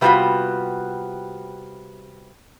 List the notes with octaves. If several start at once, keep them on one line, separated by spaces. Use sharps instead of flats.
C3 G3 A3 B3 F4 F#4